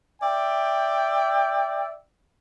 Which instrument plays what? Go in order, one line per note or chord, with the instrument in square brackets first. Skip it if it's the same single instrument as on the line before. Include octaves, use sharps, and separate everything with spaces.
[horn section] D5 E5 G5